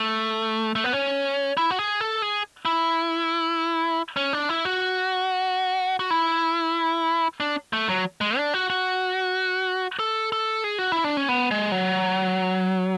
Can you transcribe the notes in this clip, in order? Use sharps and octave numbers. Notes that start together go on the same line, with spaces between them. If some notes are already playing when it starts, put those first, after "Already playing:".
Already playing: A3
A3
B3
C#4
E4
F#4
G#4
A4
G#4
E4
C#4
D4
E4
F#4
F#4
E4
D4
A3
F#3
G#3
D4
F#4
F#4
A4
A4
G#4
F#4
E4
D4
C#4
B3
G#3
F#3